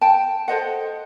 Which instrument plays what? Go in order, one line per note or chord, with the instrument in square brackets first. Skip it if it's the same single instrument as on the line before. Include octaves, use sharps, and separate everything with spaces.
[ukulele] G5 A5
A4 C5 D#5 F#5